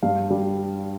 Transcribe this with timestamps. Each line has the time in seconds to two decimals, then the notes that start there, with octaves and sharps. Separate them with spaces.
0.03 G2 F5
0.30 G3